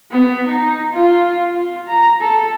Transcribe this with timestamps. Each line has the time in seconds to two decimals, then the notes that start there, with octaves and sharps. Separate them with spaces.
0.11 B3
0.46 D#4
0.93 F4
1.51 F4
1.87 A#5
2.21 A4